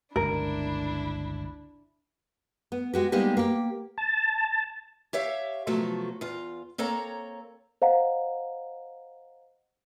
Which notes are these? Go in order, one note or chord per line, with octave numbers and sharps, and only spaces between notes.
G1 C#2 D4 E4 A#4
B3
G#3 F#4 G4
G3 G#3 A#3 B3 D#4 G4
A#3 G4
A5
G4 C#5 E5 F5
C3 F3 F#3 A3 B3 A4
E2 F4
A#3 C4 A4 C#5 A#5
C5 D#5 F5 F#5 A#5